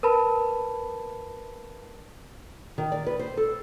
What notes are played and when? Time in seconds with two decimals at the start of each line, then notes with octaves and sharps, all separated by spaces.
0.03 A#4 B4 A5 B5
2.78 D#3
2.92 D5
3.06 B4
3.19 C5
3.37 A4